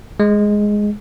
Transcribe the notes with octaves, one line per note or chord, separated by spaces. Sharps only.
G#3